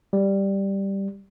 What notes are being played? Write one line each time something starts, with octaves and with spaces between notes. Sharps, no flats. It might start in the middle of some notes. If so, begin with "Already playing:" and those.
G3